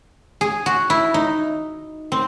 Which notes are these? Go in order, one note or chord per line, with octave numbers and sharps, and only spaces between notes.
G#4
F#4
E4
D#4
C4